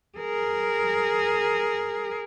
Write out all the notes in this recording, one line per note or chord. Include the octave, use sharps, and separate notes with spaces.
G#4 A#4